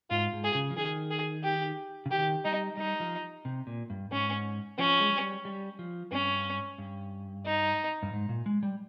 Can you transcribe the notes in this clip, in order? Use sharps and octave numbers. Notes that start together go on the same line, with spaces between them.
G#2 F4
G#2
G#4
C#3
F3
D#3 G#4
G#4
G4
C#3
D#3 G4
G3 D#4
G3 D#4
F3
C3
A#2
G2
G#2 C#4
F3 C#4
G#3
G3
G3
F3
G2 C#4
G2
D#4
G2
G#2
A#2
G#3
G3